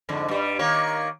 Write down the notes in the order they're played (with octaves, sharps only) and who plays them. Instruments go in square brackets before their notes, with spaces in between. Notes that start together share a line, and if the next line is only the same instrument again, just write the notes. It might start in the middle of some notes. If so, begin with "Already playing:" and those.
[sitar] F2 G#2 D3
G2 G3
D#3 A#3 C#5